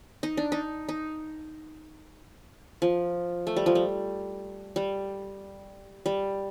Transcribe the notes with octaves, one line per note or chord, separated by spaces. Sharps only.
D#4
D4
D#4
D#4
F3
A3
G3
F3
G3
G3
G3